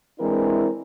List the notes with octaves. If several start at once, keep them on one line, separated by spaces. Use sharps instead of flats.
E3 G#3 C4 D4 E4 A#4